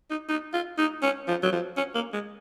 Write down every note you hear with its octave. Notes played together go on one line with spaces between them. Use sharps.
D#4
D#4
F4
D#4
C#4
F3
F#3
F3
C#4
A#3
G#3